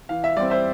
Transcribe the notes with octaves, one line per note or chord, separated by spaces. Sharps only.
E3 F5
E5
G3 C4 D5
C5 E5